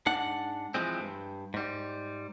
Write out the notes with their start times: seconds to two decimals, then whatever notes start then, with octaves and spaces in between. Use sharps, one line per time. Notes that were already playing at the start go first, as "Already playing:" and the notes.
0.06 G#2 D4 F#5
0.74 E3 F3 G#3 C4
1.00 G2
1.54 G#2 G3